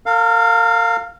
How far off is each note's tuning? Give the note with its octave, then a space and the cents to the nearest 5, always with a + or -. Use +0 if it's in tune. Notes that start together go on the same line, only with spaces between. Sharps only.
A#4 -40 F5 +10